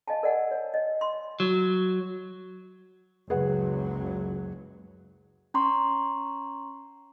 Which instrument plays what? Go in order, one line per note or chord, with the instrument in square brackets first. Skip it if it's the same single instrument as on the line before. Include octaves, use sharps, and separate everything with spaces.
[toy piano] D#5 F5 G#5 A5
A#4 D5 D#5 F#5 G#5
C#5
D#5
C6
[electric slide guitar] F#3
[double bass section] F#1 C#2 F#3 [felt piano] G#4 B4 F#5
[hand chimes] C#4 A#5 C6 C#6